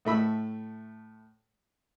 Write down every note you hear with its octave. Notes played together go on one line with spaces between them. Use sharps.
A2 A3 B5 E6